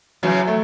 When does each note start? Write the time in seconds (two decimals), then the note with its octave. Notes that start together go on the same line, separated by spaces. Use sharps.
0.23 C#3 E3 F#3
0.47 A3